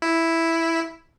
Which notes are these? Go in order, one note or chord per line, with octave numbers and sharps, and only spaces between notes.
E4